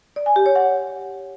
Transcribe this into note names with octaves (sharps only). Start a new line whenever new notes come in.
D5
G#5
G4
C#5
F#5